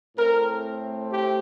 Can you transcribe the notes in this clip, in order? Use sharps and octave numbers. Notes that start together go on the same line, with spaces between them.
A2 A3 C4 A#4
G4